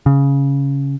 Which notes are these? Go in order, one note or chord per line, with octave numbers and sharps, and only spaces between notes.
C#3